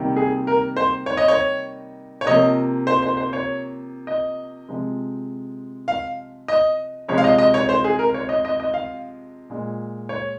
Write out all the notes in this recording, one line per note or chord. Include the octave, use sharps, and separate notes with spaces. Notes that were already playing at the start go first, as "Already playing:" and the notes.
Already playing: C3 D#3 G3 A#3
G#4
A#4
C5
C#5
D#5
C#5
C#5
C3 F3 A#3 D#5
C5
C5
C5
C#5
D#5
C3 F3 G#3
F5
D#5
C3 F3 G#3 C#5
F5
D#5
D#5
C#5
C5
G#4
A#4
C#5
D#5
D#5
D#5
F5
A#2 G#3
C#5